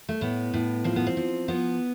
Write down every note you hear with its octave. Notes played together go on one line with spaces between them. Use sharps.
A3
A2 B3
A2
F3 C4
B3
C4
F3
F3 B3